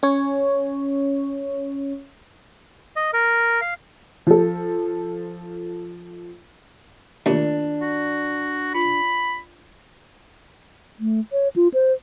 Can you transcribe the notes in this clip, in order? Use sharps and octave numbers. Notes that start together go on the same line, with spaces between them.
C#4 C#5
D#5
A#4
F5
F3 A4
D#2 D#3 A3 D4 F4
F#4
F4 B5
A3
C#5
F4
C5